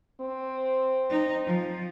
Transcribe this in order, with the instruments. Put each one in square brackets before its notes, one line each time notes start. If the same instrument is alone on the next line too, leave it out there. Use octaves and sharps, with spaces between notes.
[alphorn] C4
[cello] D#4
F3